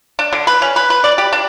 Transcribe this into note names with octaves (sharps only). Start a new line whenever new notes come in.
D4
D3
B4
C#4
B4
B4
D5
G4
D4